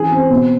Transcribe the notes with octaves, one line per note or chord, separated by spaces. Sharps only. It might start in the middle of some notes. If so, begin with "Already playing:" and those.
Already playing: E3 G#4
C4
B2